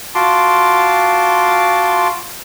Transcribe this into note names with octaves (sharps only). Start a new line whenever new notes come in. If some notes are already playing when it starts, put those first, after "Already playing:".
F4 F#4 A5 C6 D6